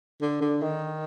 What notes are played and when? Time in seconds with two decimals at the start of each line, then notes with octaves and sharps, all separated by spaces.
0.21 D3
0.41 D3
0.62 D#3